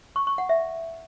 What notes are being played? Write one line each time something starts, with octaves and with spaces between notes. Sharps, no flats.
C#6
C#6
F#5
E5